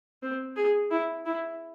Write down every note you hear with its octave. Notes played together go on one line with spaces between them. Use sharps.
C4
G#4
E4
E4